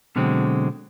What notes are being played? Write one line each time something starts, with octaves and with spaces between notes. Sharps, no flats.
B2 D3 F#3 G#3 C4